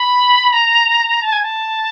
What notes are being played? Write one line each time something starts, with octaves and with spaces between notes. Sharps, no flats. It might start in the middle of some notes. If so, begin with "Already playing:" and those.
Already playing: B5
A#5
A5
G#5
A5